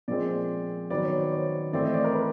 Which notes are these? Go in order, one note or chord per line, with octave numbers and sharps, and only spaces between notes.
A#2 F3 G#3 C4 D5
D#3 F#3 B3 D5
C#5
C5
C#5
A2 E3 A3 C4 D5
D#5
D5
A#4
B4